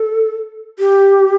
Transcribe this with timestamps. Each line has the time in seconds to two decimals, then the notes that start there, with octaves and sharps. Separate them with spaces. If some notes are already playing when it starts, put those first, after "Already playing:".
Already playing: A4
0.79 G4